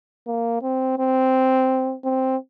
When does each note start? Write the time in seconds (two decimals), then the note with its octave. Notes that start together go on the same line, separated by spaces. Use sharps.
0.27 A#3
0.62 C4
0.99 C4
2.04 C4